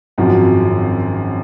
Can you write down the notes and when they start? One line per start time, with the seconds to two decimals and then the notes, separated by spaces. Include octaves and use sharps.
0.18 G#1 F#2 F3 C4 F#4